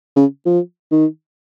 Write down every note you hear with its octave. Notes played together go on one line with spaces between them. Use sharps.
C#3
F3
D#3